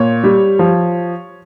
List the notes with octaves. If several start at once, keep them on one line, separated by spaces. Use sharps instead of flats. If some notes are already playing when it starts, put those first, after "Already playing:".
Already playing: A#2 C#5
G3
F3